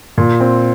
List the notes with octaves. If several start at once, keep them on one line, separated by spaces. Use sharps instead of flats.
A#2
C4